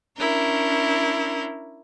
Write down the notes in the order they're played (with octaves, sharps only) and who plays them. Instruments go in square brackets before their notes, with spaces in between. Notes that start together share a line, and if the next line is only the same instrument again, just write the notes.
[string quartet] C#4 D4 E4 A#4 G6